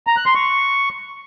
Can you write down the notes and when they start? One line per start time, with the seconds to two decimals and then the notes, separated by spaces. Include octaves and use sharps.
0.07 A#5
0.16 F#6
0.26 C6
0.35 C#6